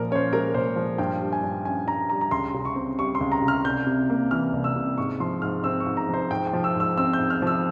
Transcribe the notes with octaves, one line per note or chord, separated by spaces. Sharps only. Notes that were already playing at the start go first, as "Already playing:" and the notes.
Already playing: A#2 F3 A#4
C#4 C#5
C5
G#3 A#4
A#2 C5
F3
G2 G5
G3
G#5
G2
C#4 G#5
G2 A#5
G3 A#5
A#5
C#2 C6
C#3
C#6
C4
G3 C#6
C6
C#2
A#5
C#3
F6
C2 G6
C3
A#3
E3 F6
C2
E6
C3
G#2 C#6
F3 C6
G#2 F6
C4 E6
C#6
G#2
A#5
F3 C5
G#2 G5
G5
F3
E6
G#2 E6
C4 E6
G6
G#2
F6
F3 E6